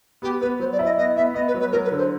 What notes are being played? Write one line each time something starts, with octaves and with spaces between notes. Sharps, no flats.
B3 G4
B3 B4
F#3 C5
D5
E4
D#5
B3 D#5
B3 E5
B3 D#5
B4
F#3
B4
F#3 A#4
B4
D3
C5